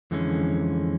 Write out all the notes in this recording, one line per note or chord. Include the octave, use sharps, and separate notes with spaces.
F2 D3 E3 G#3 A3 C#4